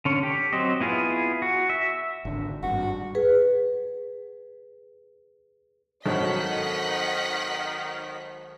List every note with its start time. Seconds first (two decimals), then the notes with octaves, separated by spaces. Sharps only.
0.05 D3 C#4
0.23 G4
0.53 F#3 C4 D#5
0.81 B3 E4 F4 G#4
1.42 F#4
1.70 E5
2.25 G#1 D3
2.63 G#1 G2 F#4
3.15 G#4 B4
6.06 G#1 D#3 F#3 A4 D#5 F#5 B6